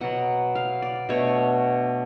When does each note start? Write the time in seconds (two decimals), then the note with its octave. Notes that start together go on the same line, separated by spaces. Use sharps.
0.01 B2 F#3 B3 F#5
0.55 F5
0.82 D5
1.09 B2 A3 D4 C#5